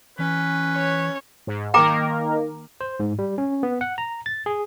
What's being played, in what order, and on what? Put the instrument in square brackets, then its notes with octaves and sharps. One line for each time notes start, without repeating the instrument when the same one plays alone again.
[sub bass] E3 [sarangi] C#4 [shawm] B4
[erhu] C#5
[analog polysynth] G#2
[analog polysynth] D#3 A#3 A#4 [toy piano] G5 A#5 D6
[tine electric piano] C5
G#2
G3
C#4
B3
F#5
A#5
A6
G#4